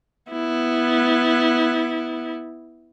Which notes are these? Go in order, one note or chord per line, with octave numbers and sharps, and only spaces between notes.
B3 E4